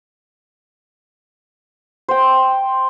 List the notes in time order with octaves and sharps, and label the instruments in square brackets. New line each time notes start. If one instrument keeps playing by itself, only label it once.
[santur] C5 G5